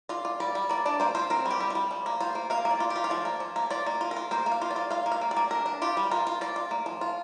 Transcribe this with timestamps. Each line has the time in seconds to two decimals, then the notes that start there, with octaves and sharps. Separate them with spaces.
0.09 F4 D5
0.25 F4
0.40 G3 D5
0.55 G3
0.69 A#3 D5
0.86 D4 D5
1.00 A#3 C5
1.15 F4 C5
1.30 C4 A#4
1.46 G3 G4
1.60 G3
1.70 F4
1.75 G3
1.91 F3
2.06 A#3
2.20 F4 C5
2.35 A#3
2.50 A#3 F5
2.65 A#3
2.71 D5
2.80 F4
2.90 G4
2.96 F4
3.04 F5
3.10 F3 D5
3.25 A#3
3.40 F3
3.56 A#3
3.70 F4 D5
3.86 A#3
4.01 F4
4.11 A#4
4.17 F4
4.31 A#3 C5
4.46 A#3
4.52 F5
4.62 F4
4.71 D5
4.76 F4
4.91 F4 F5
5.06 A#3
5.12 F5
5.21 A#3
5.31 D5
5.37 A#3
5.51 D4 A#4
5.66 D4
5.82 F4 G4
5.97 G3
6.11 F4 A#4
6.27 F4
6.41 F4 D5
6.56 F4
6.71 A#3
6.86 F3
7.01 F4